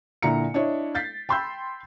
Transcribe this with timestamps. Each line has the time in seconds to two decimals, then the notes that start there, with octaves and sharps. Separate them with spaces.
0.23 A#2 D3 E4 A#5 C#7
0.54 D4 E4 C#5 D#5
0.95 G6 A6 B6 C7
1.29 G5 B5 C6 E6 G6